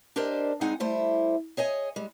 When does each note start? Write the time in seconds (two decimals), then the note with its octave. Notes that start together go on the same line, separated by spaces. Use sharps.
0.16 D4 G4 A#4 C5 D5 D#5
0.61 G2 G#3 C4 D#4 F#5 G#5
0.80 G3 A3 E4 C5
1.57 G#4 C#5 D#5 G#5
1.96 G3 G#3